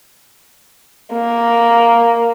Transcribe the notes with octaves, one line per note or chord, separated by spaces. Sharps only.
A#3